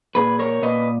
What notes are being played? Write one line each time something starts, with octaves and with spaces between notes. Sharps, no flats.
A#2 G#4 B4
A#4 C#5
A#2 B4 D#5